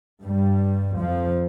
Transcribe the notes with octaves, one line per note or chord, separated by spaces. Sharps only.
G2 G3
F2 F3